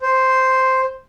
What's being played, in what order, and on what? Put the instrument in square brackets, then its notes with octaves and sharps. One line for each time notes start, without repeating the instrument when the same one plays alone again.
[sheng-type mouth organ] C5